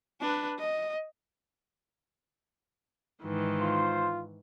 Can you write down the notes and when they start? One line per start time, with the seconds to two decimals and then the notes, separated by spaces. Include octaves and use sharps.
0.21 D4 B4
0.59 D#5
3.23 G#2 D#3 E3
3.61 F4 C5